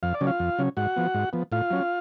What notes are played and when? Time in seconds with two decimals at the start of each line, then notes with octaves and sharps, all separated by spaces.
0.03 F2 F5
0.14 D5
0.21 C#3 F#3 C#4
0.27 F4 F5
0.40 F2
0.59 C#3 F#3 C#4
0.77 G#2 F#4 F#5
0.96 F3 B3
1.14 G#2
1.33 F3 B3
1.52 A2 F4 F5
1.71 F#3 C#4